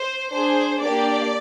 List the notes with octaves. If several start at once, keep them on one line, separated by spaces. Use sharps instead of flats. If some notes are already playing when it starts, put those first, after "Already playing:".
Already playing: C5
D4 G#4 C5
A#3 D4 G4 D5